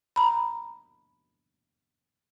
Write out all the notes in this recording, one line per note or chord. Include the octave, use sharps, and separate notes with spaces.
A#5 B5